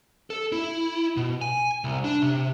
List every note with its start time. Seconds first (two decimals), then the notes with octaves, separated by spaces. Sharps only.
0.30 A4
0.52 E4
1.17 B2
1.41 G#5
1.84 C2
2.04 D4
2.22 C3